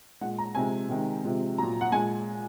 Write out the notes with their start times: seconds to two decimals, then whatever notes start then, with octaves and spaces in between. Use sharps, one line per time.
0.21 A#2 G#3 F#5
0.38 A#5
0.55 C3 F3 G#3 G#5
0.89 C3 D#3 G#3
1.24 C3 F3 G#3
1.58 A#2 F#3 A#5
1.81 F#5
1.92 A#2 G#3 G#5